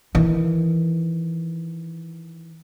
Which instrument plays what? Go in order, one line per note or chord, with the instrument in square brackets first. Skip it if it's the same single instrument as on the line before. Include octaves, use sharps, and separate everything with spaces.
[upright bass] D#3 E3